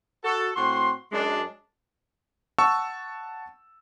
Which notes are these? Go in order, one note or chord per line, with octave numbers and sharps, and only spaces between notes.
F#4 A4
A2 C4 F#4 C6
F#2 G#3 D4
F#5 A5 C#6 E6